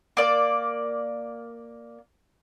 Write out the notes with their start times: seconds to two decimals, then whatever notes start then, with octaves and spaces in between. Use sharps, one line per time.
0.17 A#3 D5